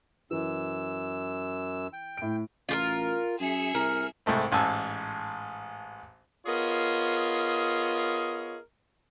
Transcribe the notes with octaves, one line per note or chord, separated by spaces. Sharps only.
F#2 E3 E6
G5
A2 D7
A1 F4 G4 A#4
F#2 G#4 E5 C#7
C2 A#4
C2 G#2 A3 C4
A1 G#2 G#5 A5 E6
B3 F4 G#4 A#4 C#5 D#5